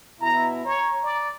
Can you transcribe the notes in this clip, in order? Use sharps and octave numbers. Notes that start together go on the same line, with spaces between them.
B2 E4 A#5
C#5 A#5
D5